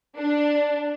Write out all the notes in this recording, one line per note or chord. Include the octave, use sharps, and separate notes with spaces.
D4